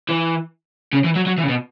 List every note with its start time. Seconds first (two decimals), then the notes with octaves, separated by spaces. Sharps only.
0.09 E3
0.93 C#3
1.04 E3
1.15 F#3
1.26 F#3
1.38 E3
1.43 C#3
1.49 B2